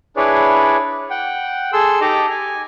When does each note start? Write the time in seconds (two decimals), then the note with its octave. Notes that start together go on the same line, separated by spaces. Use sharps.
0.17 D4 E4 G#4 B4 C#5 D5
1.10 F#5 G5
1.73 G#4 A4 C6 E6
2.01 D#4 G4 A4 D#5 A#5 D6
2.30 G#5